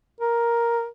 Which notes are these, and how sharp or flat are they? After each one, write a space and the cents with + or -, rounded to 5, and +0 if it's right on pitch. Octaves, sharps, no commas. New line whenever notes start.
A#4 +5